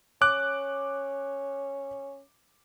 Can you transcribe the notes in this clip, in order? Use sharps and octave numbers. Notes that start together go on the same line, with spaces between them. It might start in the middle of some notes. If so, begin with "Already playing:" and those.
C#4 D6 F#6